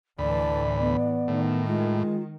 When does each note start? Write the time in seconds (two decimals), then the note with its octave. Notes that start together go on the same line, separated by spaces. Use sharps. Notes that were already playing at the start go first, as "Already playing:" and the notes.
0.19 D2 A2 E3 D5 A5 B5
0.79 B3
1.28 A2 D#3
1.67 G#3 F4